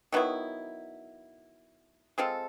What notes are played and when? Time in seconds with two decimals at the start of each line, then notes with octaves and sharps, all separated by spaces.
0.12 D#3 F#3 B3 E4
2.18 G#3 C4 F4 A4